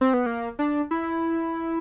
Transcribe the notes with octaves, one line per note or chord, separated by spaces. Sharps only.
C4
B3
A#3
D4
E4